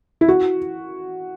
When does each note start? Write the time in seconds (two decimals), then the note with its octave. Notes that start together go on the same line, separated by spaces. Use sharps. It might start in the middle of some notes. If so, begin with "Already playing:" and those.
0.21 E4
0.28 F#4